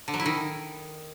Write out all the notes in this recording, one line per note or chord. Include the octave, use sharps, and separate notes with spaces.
D3
F#3
E4
D#3